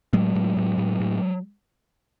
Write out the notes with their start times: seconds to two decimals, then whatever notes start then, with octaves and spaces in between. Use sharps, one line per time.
0.13 A2 F#3 G#3
0.35 A2
0.57 A2
0.78 A2
1.00 A2